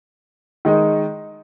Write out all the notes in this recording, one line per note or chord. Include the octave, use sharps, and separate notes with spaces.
D#3 G#3 D#4